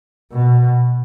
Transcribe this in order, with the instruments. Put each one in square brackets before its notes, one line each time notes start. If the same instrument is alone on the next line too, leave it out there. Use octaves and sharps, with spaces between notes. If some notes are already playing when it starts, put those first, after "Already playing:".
[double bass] B2